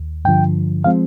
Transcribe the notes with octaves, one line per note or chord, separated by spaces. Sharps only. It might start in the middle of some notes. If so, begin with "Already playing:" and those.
Already playing: D#2
G2 D3 F3 G5
F3 G#3 C4 F5